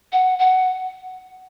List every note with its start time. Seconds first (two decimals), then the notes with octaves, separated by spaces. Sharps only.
0.13 F#5
0.39 F#5